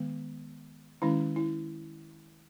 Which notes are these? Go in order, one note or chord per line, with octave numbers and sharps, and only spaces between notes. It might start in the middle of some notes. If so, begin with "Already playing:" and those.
Already playing: D#3 G#3 B3
D#3 G#3 C#4 E4
E4